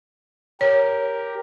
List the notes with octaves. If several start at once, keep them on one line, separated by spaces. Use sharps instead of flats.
G4 A#4 C#5